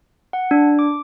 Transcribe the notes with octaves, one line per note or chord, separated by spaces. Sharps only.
F#5
D4
D6